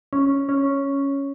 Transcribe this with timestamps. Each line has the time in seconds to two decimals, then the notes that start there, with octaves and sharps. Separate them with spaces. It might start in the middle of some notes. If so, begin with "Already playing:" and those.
0.13 C#4
0.49 C#4